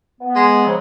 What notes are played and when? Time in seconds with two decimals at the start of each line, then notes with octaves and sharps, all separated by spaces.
0.21 B3
0.35 G#3
0.64 C#3 F3 F#3